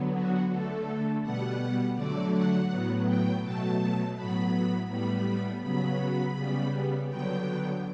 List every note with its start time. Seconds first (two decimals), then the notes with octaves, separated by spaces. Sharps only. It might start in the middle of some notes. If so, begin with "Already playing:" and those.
Already playing: D3 F#3 B3
0.13 F#4
0.50 D3 A3 A4
1.23 B2 G3 B3 F#5
1.96 D3 F#3 A3 D5
2.33 F#5
2.70 A2 F#3 B3
3.06 G5
3.42 B2 F#3 A3 A5
4.16 A2 F#3 B3 B5
4.89 A2 G3 B3 B5
5.62 C#3 F#3 B3 B5
6.36 C#3 G3 B3
7.09 D3 F#3 B3 G5